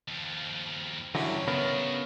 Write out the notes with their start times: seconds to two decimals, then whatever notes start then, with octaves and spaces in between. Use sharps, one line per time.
0.08 D#2 F3
1.15 G2 D3 E3 F#3 C#4
1.48 C#3 A3 B3 D4 A#4